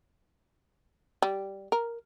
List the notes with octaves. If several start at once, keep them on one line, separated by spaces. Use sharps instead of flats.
G3
A#4